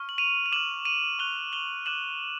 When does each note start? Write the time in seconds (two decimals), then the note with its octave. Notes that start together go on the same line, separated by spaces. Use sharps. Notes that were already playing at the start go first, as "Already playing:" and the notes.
Already playing: C#6 F6
0.09 F#7
0.18 D#7 F7
0.46 F7
0.52 D6 F6 E7 F#7
0.85 D#7 F7
1.19 C#6 F#6 F7 G7
1.53 F7 G7
1.86 D6 F#6 E7 F#7